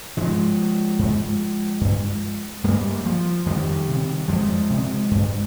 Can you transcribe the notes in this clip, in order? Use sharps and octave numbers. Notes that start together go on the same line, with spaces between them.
G#2 F3 G#3
G#2
G2
G2 G3 A#3
F3
F2 D#3 G3
C3
F2 F3 G#3
C3
G2